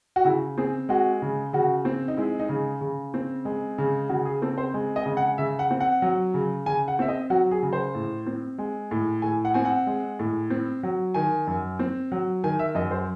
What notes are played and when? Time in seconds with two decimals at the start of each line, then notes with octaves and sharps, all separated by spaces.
0.16 F#4
0.25 C#3 E4
0.58 C4 G#4
0.89 G#3 F#4
1.22 C#3
1.53 C#3 F#4
1.85 C4
2.08 D#4
2.17 G#3 E4
2.40 D#4
2.49 C#3
2.81 C#3
3.14 C4
3.45 G#3
3.78 C#3
4.09 C#3 F#4
4.25 G#4
4.42 C4 A4
4.58 C5
4.74 G#3
4.96 D#5
5.06 C#3
5.17 F#5
5.38 C#3 E5
5.59 F#5
5.71 C4
5.80 F#5
6.02 F#3
6.34 C#3
6.66 C#3 G#5
6.88 F#5
6.99 C4 E5
7.08 D#5
7.30 F#3 F#4
7.51 G#4
7.62 C#3
7.73 C5
7.95 A2
8.26 C4
8.58 G#3
8.91 A2
9.22 A2 G#5
9.45 F#5
9.54 C4 G#5
9.65 F#5
9.87 G#3
10.19 A2
10.50 C4
10.83 F#3
11.14 D#3 G#5
11.47 F#2
11.79 C4
12.12 F#3
12.44 D#3 G#5
12.59 E5
12.75 F#2 D#5
12.91 C5